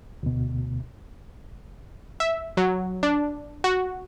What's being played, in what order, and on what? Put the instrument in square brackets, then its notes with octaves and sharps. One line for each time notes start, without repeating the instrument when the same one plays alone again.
[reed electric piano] D2 B2
[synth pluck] E5
F#3
D4
F#4